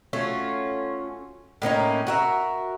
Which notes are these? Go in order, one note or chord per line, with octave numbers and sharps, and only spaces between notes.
A3 C#4 F4 F#4
A2 A#3 C#4 D#4
F#4 A#4 E5